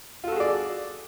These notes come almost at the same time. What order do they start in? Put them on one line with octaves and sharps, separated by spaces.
F4 A4 F#4 G#4 D5